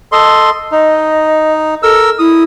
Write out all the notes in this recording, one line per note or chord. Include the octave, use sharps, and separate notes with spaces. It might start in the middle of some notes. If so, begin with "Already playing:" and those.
A4 D#5 C6
D#4 D#5
A4 A#4 E6
E4 D#6